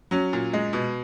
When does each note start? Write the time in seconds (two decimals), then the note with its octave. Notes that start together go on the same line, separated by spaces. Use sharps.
0.11 F#3 C#4
0.33 A#2
0.53 G#3
0.73 B2